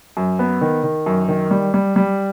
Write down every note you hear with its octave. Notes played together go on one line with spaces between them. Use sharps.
F#2
B3
D#3
D#3
F#2
D#3
G3
G3
G3